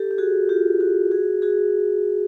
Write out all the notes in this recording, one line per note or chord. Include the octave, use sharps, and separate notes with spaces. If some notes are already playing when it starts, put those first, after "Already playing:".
Already playing: G4 A4
G4
F#4 G#4
F4 G4
F#4 G#4
F#4 G#4
F#4 G#4